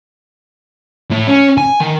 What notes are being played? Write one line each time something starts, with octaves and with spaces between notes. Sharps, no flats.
A2
C#4
G#5
D#3